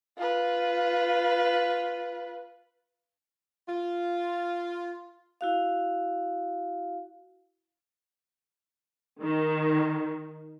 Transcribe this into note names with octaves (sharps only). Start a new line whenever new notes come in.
F4 B4
F4
E4 F#4 F5
D#3